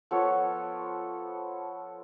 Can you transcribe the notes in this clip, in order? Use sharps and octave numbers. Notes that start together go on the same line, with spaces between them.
F3 B3 A4 C#5